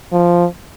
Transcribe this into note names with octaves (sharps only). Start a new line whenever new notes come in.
F3